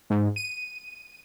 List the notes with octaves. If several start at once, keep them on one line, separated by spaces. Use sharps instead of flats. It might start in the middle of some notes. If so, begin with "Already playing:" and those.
G#2
D#7